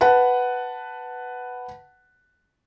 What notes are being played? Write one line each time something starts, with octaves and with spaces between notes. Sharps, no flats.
B4 F#5 A5